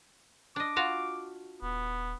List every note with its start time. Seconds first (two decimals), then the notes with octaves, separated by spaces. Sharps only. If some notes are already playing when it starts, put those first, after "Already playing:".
0.56 D4 D#5 D6
0.76 F4 F#4 F5
1.62 D#1 B3